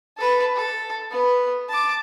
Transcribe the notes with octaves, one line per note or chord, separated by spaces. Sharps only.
A4 B4
A4
B3 B4
A5 D6